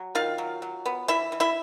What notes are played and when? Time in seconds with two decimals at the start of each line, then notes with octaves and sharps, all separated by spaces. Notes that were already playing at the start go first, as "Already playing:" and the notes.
Already playing: F#3
0.15 D#3 F4 F5
0.38 F#3
0.62 F#3
0.86 B3
1.08 E3 E4 E5
1.32 E3
1.40 E4 E5